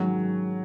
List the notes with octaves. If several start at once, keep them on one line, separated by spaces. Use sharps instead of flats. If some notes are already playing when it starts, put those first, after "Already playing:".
Already playing: G#2 D#3 F#3 G#3 C#4